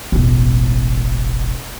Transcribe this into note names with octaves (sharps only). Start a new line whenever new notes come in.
E1 A1